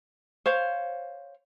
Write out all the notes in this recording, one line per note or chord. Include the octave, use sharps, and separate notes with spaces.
C5 C#5 F5